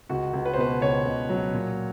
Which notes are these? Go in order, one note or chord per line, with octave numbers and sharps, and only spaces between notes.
C#2 F#4
C#2
B4
C5
B2 B4
C#2 C#5
C#2
F#3
A#2